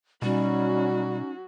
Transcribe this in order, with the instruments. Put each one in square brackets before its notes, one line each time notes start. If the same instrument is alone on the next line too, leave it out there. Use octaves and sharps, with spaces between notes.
[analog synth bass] B2 [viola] F#3 F#4 [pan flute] G3 [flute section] C#4 D#4